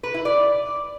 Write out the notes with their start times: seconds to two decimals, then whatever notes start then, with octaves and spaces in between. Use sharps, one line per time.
0.03 B4
0.14 E4
0.25 D5